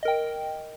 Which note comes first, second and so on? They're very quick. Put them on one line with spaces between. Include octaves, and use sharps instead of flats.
D#5 A#4 G5